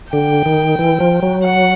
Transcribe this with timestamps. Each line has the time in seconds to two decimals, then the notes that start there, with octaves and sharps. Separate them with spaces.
0.13 D3 G5
0.46 D#3
0.79 E3
1.00 F3
1.22 F#3
1.45 F#5